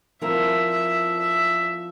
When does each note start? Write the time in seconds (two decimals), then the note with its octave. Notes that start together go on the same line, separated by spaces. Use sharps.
0.21 F3 C4 E4 A#4 E5
0.70 E5
1.19 E5